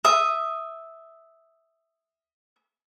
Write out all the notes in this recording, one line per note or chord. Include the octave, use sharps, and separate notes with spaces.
E5 D#6